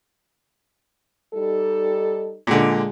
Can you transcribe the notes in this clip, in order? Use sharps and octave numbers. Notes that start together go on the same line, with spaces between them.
G3 D#4 A4
A#2 D3 G#3